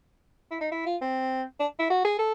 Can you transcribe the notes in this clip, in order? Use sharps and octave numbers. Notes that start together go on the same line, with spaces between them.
E4
D#4
E4
F4
C4
D4
E4
F#4
G#4
A4